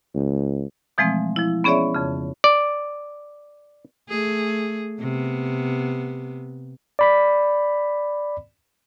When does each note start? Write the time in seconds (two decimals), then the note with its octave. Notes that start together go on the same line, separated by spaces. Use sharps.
0.15 C#2
0.98 B2 E3 F3 G#3 A3 C4
1.36 F3 E4
1.64 B3 C#4 G#4 C#5 D5 E5
1.94 F2 C#3
2.44 D5
4.09 A3 G#4
5.00 C3 B3
6.99 D5 B5 B6